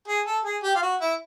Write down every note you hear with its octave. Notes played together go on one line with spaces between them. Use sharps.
G#4
A4
G#4
G4
F4
F#4
E4